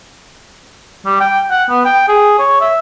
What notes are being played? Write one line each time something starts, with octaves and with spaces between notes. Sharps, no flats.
G3
G5
F#5
B3
G5
G#4
C#5
E5